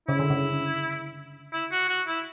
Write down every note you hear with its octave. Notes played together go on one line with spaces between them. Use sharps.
C#3 E4
D3
C#3
E4
F#4
F#4
E4